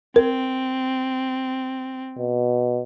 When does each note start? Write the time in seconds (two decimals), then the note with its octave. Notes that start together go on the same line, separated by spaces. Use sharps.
0.16 C4 A#4
2.18 B2